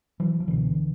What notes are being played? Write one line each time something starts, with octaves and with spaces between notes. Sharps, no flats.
E3 F#3
F3
C#2 B2 D3 E3